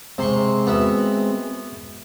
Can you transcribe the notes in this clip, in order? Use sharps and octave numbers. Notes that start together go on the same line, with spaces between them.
C3 G#3 C4 C6 C#6
B3 F#4 E5